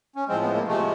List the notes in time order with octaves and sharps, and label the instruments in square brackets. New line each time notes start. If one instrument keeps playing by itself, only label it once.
[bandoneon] C#4
A2 F3 G#3 C4
B3
A#3
C3 F3 G#3 A3